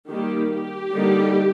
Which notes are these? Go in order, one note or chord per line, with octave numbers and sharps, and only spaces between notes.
D#3 G3 A#3 G4
G4
D3 G3 A#3 D#4